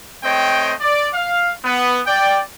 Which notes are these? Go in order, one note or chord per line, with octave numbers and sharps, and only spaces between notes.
A3 C4 C#5 D#5 G5
D5
F5
B3
D5 G5